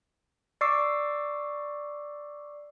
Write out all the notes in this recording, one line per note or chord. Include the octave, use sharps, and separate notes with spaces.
D5 C#6 D6 E6 C7